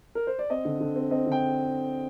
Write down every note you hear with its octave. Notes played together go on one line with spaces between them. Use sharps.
A#4
C5
D5
C4 D#5
D3
D3
C4
C4 D#5
D3 G5